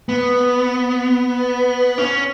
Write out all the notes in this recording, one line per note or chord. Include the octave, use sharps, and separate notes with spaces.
B3
C#4